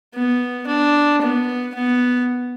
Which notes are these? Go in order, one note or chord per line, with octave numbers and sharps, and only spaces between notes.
B3
D4
B3
B3